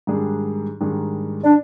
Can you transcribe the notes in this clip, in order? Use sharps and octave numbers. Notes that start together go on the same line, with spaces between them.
G#2 D#3 G3 D4 G#4
G#2 D#3 G3 D4 G#4
D4